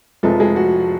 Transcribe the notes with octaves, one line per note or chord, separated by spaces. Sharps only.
F1 F2 F3 G#3 A3 A4
G#3 G#4
F#4